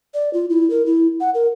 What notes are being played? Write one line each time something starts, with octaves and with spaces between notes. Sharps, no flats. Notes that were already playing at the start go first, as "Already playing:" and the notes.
D5
F4
E4
A#4
E4
F#5
A#4